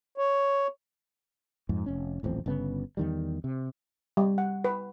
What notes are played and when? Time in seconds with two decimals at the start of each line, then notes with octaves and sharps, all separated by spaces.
0.18 C#5
1.69 F2 G#2
1.86 F1 C#4
2.23 D#1 A1 F2 C4
2.46 G1 C#3 B3
2.97 E2 D#3 G3
3.44 C3
4.17 G3
4.38 F#5
4.65 B4